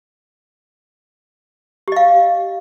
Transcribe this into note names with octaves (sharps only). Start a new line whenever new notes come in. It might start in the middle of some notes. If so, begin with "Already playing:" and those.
G4 D#5 F5